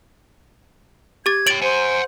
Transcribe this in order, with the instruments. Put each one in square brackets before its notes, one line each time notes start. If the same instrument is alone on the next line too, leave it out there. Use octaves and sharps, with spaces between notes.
[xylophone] G4 D6 A6 [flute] G#6
[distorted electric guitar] C#5 G5 [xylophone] A6 D7 F#7
[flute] C5 [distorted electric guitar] F#5 G#5